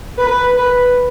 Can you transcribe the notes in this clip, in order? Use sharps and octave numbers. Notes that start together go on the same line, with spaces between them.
B4
B4